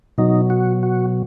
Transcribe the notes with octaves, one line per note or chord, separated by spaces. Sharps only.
B2 F#3 D#4
F#4
F#4